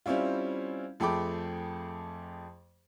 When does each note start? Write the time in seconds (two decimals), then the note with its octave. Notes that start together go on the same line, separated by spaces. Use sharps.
0.06 G3 C4 C#4 E4 F4
1.00 F2 A3 G#4 G5 B5 D6